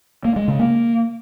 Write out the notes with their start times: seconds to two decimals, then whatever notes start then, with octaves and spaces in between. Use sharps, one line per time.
0.25 A#3
0.36 G#3
0.48 C#3
0.59 A#3